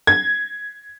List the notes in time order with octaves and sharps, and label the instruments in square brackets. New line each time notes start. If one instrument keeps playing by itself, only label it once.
[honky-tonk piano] G#6